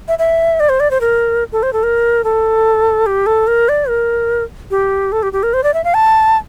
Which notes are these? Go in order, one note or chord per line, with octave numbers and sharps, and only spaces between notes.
E5
E5
D5
C5
D5
C5
A#4
A4
C5
A4
A#4
A4
G4
A4
A#4
D5
A#4
G4
A4
G4
G4
A#4
C5
D5
E5
F5
A5